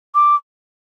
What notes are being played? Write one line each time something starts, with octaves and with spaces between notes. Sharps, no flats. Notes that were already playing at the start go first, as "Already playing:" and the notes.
D6